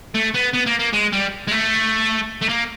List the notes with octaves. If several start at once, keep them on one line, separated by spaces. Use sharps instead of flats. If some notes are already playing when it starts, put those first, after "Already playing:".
A3
B3
B3
A#3
A#3
G#3
G3
G#3
A3
A3
A#3